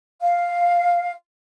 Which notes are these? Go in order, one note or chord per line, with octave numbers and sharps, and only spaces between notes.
F5